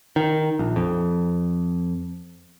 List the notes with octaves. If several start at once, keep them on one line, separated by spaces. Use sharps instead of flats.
D#3
A#1
F2